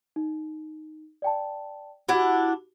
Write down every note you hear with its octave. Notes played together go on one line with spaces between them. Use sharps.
D#4
D5 G5 A5
D4 E4 F#4 G4 F#5